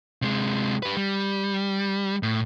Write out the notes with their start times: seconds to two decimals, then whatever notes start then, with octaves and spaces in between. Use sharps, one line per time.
0.22 C3 G#3
0.83 G4 B4
0.97 G3
2.23 A2